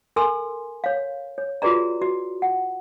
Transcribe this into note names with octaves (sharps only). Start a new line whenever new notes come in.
A4 A#4 G#5 C6 E6
C#5 F5
C#5
F4 F#4 G#4 B4 D5 A#5
F#4
F#5